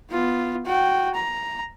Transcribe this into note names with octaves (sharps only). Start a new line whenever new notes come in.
B3 F4
F#4 G5
A#5